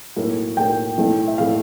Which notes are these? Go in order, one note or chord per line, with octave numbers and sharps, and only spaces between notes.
B1 A2 F#3 A#3
B1 A2 F#3 A#3 G5
B1 A2 E3 A3
E5
A2 E3 A3 F5